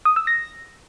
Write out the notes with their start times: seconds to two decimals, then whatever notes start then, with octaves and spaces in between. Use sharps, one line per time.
0.05 D#6
0.16 E6
0.27 A#6